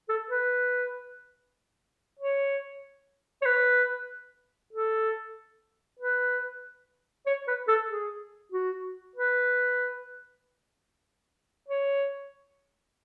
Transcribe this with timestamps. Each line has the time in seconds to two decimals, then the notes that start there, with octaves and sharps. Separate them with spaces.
0.09 A4
0.30 B4
2.20 C#5
3.42 C#5
3.46 B4
4.73 A4
6.00 B4
7.27 C#5
7.48 B4
7.68 A4
7.89 G#4
8.52 F#4
9.16 B4
11.69 C#5